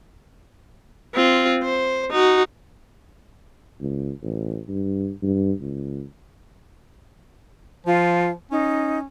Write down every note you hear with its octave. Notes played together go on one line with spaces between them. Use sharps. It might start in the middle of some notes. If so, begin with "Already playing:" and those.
C4 F4
C5
D#4 F#4
C#2
A1
G2
G2
C#2
F3 F4
C#4 D#4